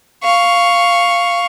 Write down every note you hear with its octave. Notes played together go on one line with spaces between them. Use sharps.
F5 C#6